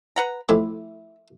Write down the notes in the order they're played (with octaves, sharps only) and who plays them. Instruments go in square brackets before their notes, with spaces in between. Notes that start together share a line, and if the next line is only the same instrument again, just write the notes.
[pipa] B4 F#5 A#5
[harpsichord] F2 A2 D6 [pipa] E4